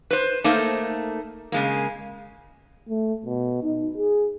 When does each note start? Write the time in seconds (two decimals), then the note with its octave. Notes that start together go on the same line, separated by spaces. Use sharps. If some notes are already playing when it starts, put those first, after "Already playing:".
0.11 B4 C5
0.44 A3 A#3 D#4 A4 A#4 C5
1.52 C#3 G#3 A#3
2.89 A3
3.25 B2
3.63 D#4
3.97 G#4